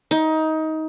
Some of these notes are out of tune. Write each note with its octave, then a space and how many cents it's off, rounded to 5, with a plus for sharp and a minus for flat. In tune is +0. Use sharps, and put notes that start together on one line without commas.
D#4 +20